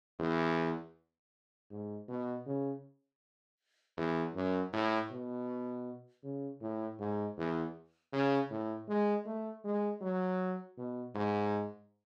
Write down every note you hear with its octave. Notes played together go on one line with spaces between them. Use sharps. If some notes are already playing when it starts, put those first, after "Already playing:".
E2
G#2
B2
C#3
E2
F#2
A2
B2
C#3
A2
G#2
E2
C#3
A2
G#3
A3
G#3
F#3
B2
G#2